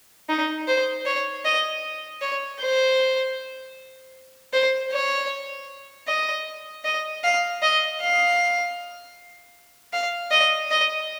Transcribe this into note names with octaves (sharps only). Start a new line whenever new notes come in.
D#4
C5
C#5
D#5
C#5
C5
C5
C#5
D#5
D#5
F5
D#5
F5
F5
D#5
D#5